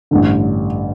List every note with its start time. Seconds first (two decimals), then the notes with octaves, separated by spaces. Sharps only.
0.11 A1 G2 D3